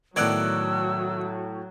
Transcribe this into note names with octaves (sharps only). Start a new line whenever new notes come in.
A2 D#3 F#3 B3 D5 E6 F#6 G#6